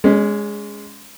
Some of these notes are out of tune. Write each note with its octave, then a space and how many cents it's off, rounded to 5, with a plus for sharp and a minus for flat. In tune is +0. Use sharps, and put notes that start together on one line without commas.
G#3 -5 C#4 +25